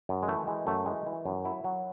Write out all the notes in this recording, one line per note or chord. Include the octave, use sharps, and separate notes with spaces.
F#2
G#3
E3 A3
E3 G#3
F#2 A3
E3 G#3
E3
F#2
F#3 E4
F#3